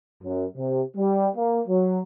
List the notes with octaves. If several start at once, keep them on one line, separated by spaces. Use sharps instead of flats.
F#2
C3
G3
A#3
F#3